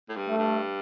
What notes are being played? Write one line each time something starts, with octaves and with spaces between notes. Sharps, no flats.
A2
G2
A3
G2